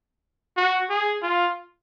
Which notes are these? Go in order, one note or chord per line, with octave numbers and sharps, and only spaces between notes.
F#4
G#4
F4